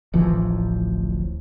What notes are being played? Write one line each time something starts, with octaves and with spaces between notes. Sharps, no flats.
D1 A1 E3 F3